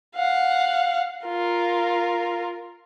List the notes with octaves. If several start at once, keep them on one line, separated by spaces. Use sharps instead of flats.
F5 F#5
F4 A#4